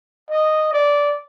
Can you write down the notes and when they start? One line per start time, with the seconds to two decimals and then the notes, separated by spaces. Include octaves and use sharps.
0.31 D#5
0.73 D5